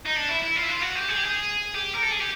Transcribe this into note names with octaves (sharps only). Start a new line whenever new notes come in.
D#4
D4
E4
E4
F4
E4
F4
F#4
G4
G#4
G4
G#4
G4
A#4
A4
G#4
G4